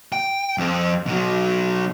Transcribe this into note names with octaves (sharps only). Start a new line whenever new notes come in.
G5
F2 C4
B2 F#3